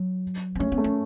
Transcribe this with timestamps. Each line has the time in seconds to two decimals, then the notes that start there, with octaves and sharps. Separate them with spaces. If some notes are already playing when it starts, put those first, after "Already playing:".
Already playing: F#3
0.55 B3
0.59 A3 C#4
0.72 B3
0.78 A3
0.84 C#4